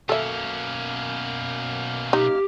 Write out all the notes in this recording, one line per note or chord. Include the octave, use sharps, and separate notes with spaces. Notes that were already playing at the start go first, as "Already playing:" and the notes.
F#2 B2 A#3 C#4 A4 E5 F6
D#4 G4